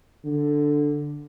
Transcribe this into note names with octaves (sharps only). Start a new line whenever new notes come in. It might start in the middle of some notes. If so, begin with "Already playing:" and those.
D3